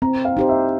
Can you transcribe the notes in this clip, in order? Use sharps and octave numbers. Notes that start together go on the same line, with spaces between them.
C4 A#5
F5
D#4 G4 C5
E5